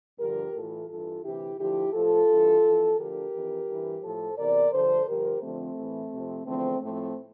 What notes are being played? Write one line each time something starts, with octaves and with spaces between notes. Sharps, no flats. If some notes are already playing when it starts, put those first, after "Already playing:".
G2 D3 F3 G4 A#4
A2 E3 F4 A4
G2 E3 F4 A4
D2 C3 E3 E4 G4
D2 D3 F3 E4 G4
A2 F3 F4 A4
G2 E3
F2 E3
D2 D3 F3 G4 A#4
F2 E3
G2 E3
A2 F3 A4 C5
E2 C3 E3 A#4 D5
G2 D3 F3 A4 C5
G2 D3 F3 G4 A#4
F2 D3 F3 A3 C4
A2 E3
F2 C3 F3
E2 D3 F3 A3 C4
A2 F3 A3 C4